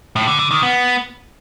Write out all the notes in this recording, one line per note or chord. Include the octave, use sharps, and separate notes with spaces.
A2
D3
D3
D#3
B3